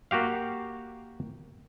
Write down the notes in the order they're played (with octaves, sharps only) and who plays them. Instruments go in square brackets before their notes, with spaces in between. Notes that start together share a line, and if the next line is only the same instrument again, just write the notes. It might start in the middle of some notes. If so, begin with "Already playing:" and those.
[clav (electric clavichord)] A#3 F#4 G4 F5